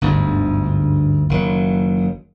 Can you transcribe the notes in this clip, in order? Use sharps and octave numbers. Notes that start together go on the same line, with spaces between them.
G1 D2 G#2
F#1 D#3 F#3